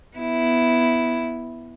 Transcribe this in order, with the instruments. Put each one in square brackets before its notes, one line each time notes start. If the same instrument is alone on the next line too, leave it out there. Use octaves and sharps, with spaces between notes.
[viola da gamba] B3 E4